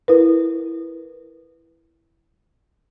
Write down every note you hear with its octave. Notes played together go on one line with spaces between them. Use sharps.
E4 A#4 B4